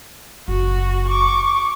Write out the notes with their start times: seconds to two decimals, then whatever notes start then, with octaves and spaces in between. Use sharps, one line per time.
0.48 F#1 E3 F#4
1.08 C#6 D6